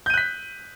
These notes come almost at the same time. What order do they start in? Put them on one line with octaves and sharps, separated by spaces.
G6 D#7 F#6 B6